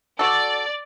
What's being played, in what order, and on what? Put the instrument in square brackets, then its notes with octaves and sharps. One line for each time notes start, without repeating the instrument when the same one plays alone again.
[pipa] F#4 A4 [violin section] D5